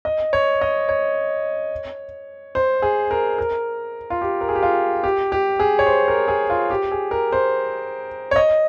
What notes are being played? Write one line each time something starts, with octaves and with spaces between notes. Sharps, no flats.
D#5
C#5
D#5
C#5
C5
G#4
A#4
A#4
F4
G4
A#4
G#4
G4
F4
G4
G4
G#4
C#5
C5
A#4
G#4
F4
G4
G#4
A#4
C5
C#5
D#5